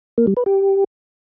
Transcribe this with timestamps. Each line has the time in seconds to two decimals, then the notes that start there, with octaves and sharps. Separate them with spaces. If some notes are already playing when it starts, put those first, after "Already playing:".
0.18 A#3
0.27 G3
0.37 B4
0.46 G4